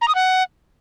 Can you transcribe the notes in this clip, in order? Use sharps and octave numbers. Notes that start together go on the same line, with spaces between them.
A#5
D#6
F#5